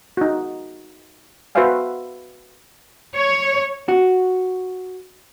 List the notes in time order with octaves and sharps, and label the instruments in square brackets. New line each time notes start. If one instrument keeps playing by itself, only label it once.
[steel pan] D#4 F#4
F#4 B4 C5 E5 F5 G#5
[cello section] C#5
[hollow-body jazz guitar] F#4